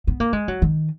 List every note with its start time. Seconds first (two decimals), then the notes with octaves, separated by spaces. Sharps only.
0.07 B3
0.20 A#3
0.33 G#3
0.48 F#3
0.62 D#3